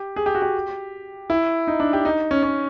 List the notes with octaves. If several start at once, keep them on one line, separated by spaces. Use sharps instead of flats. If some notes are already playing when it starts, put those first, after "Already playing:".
Already playing: G4
G#4
G4
F#4
G4
E4
D#4
D4
G4
D#4
C#4
C#4